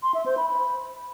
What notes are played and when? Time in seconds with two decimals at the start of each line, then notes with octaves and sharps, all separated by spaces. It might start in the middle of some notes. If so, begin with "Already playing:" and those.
0.03 C6
0.14 E5
0.26 C5
0.37 B5
0.49 B5